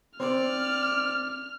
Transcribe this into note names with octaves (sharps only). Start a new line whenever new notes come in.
C4 C5 D5 F6